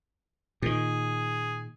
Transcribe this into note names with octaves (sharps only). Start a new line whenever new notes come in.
A#2 D#3 G#4